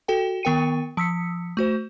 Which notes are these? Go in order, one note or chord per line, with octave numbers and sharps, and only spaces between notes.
F#4 A4 G5
D#3 B3 A#4 G5 C#7 D#7
F3 E6 B6 C#7
A3 F#4 C5